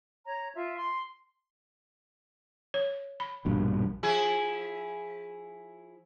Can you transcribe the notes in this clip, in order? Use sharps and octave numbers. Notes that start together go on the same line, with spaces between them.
C#5 A#5
F4 E5
C6
C#5
B5
A#1 G2 B2
F3 E4 G#4